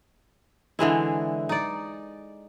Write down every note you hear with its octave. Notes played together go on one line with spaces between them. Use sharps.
D3 E3 G#3 E4
D#4 D5